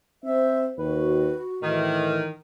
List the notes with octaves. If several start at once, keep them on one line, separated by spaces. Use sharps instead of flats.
C4 C5 E5
D#2 F#4 B4
A2 D#3 E3